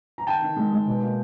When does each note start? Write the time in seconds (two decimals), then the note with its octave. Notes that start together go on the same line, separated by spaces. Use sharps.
0.18 A#5
0.27 D#3 G5 A5
0.42 D#3
0.56 G#3
0.72 G#3
0.87 B2
1.02 A#3